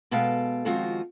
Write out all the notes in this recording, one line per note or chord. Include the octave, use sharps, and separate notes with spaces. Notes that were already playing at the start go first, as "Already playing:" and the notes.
B2 G#3 B3 A4 F5 G5
D#3 F3 G#3 C4 F4 F#4